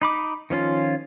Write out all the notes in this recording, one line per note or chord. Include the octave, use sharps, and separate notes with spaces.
D#4 B5 D6
D#3 F3 C#4 F4